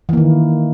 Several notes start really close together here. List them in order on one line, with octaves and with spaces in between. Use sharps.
E3 A#3 D#3